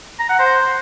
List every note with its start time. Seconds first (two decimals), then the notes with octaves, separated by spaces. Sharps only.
0.20 A#5
0.30 F#5
0.40 C5